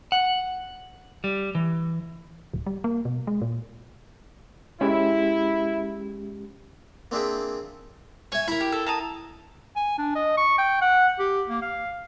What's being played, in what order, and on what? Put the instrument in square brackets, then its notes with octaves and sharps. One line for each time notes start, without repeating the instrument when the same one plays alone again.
[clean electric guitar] F#5
G3
E3
[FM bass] D1
G3
A#3
B2
G#3
A#2
[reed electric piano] G#3 C#4 G4 [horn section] E4
[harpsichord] A#3 C4 D4 G#4 E5 G5
[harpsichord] C#5 E5 [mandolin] G#5
[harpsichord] E4 A#4 [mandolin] B5
[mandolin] G4
A4
A5 A#5 D#6
[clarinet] G#5
D4
D#5
C#6
G5
F#5
G4
A#3
F5